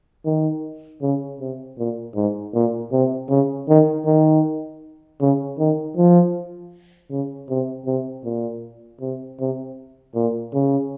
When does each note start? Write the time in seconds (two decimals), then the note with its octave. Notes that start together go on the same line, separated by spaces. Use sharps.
0.25 D#3
1.02 C#3
1.40 C3
1.78 A#2
2.15 G#2
2.54 A#2
2.92 C3
3.30 C#3
3.69 D#3
4.06 D#3
5.21 C#3
5.59 D#3
5.97 F3
7.11 C#3
7.49 C3
7.86 C3
8.24 A#2
9.01 C3
9.40 C3
10.15 A#2
10.54 C#3